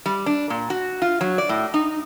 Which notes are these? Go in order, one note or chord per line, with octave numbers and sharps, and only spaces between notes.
G3
D4
A#2
F#4
F4
F#3
D5
A2
D#4